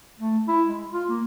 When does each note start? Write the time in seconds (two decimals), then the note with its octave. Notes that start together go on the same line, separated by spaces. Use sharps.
0.20 A3
0.48 E4
0.66 G#3
0.92 F4
1.09 A#3